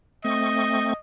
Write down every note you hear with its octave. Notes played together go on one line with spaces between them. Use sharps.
A3 C4 D#5 C#6